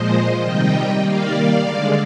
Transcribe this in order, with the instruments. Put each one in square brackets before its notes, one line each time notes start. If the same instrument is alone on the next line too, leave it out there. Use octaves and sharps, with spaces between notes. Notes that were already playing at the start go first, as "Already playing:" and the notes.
Already playing: [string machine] A#2 F3 G#3 C5 D#5
C3 D#3 G3 D#5 G5
D#3 G3 A#3 D5 F5
D3 G#3